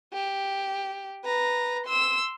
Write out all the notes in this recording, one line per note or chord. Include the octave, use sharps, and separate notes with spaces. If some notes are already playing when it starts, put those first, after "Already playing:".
G4
B4 A#5
C6 E6